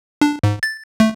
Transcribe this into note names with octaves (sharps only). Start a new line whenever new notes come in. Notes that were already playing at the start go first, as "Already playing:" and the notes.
D4
G#2
A6
A3